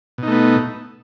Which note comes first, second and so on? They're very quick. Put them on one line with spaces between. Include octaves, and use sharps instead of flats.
B2 D#4 A3 B3